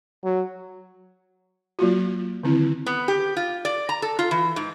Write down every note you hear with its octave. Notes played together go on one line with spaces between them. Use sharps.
F#3
F#3 A#3 F4 F#4
D3 D#3 C4 E4
B3
G4
F4
D5
A#5
A4
F4
E3
G#2